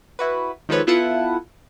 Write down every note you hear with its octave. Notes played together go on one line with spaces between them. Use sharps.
E4 F#4 B4
D#3 F3 G#3 A4 B4 C#5
B3 E4 F4 A4 B4 F#5